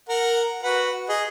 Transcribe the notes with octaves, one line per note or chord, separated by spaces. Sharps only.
A#4 F#5
F#4 B4 F#5
G#4 D#5